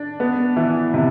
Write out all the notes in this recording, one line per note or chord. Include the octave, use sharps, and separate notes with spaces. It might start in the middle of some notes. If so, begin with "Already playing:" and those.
Already playing: D4
B3
E3
C3